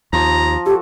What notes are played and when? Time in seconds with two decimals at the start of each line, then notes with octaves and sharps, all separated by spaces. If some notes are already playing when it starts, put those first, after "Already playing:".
0.13 D#2 F3 A#5
0.66 F#4 G4 A4